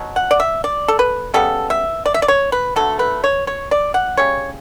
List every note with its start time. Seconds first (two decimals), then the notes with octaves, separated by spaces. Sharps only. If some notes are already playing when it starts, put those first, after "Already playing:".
Already playing: B2 F#3
0.16 F#5
0.31 D5
0.40 E5
0.64 D5
0.88 A4
0.99 B4
1.34 C#3 G3 B3 A4
1.70 E5
2.06 D5
2.14 E5
2.22 D5
2.28 C#5
2.52 B4
2.76 D3 F#3 A3 A4
2.99 B4
3.24 C#5
3.47 C#5
3.71 D5
3.94 F#5
4.17 C#3 G3 C#5